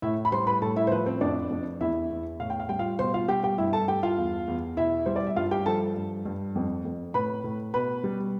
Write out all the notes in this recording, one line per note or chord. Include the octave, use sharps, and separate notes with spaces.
A2 E4 E5
B5
G3 C5 C6
B4 B5
A2 A4 A5
E4 E5
C5
F3 B4
C4 C5
F2 D4 D5
F2
E2 E4 E5
E2
A2 F5
G5
F5
G3 G5
F4 F5
B2 C5 C6
F4 F5
G3 G4 G5
G4 G5
G2 E4 E5
A4 A5
G2 G4 G5
F4 F5
E2
E2
B2 E4 E5
G3 C5
D5
E5
G2 F4 F5
G4 G5
F3 A4 A5
G2
G2
F2
F2
A2 B4 B5
A2
B2 B4 B5
G3